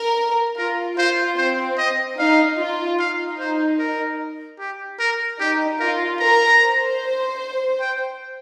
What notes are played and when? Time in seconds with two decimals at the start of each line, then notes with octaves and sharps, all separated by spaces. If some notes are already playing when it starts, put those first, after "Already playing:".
Already playing: A#4
0.57 F4 A#4
0.97 F4 C5
1.37 C4 C5
1.78 D#5
2.18 D#4 F5
2.58 F4
2.98 D#4 F5
3.39 C5
3.78 A#4
4.59 G4
4.99 A#4
5.40 D#4 G4
5.80 F4 A#4
6.20 A#4 A#5
6.60 C5
7.80 G5